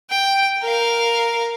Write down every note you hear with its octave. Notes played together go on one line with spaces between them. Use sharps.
G5
A#4 F5